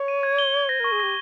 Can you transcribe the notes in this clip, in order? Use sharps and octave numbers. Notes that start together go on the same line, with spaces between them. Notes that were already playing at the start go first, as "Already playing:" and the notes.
Already playing: C#5
D#7
G#6
G7
G#6
C5 A#6
A#4 C#6
G#4
G4 A#6